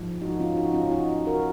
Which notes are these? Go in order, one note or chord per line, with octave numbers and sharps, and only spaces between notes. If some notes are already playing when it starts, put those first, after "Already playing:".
Already playing: G#2 F3
D#4 F#4
C#4 F4
D#4 F#4
C#4 F4
D#4 F#4
F#4 A#4